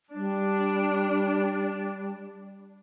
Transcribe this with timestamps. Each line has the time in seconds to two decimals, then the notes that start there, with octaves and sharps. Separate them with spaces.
0.15 G3 D4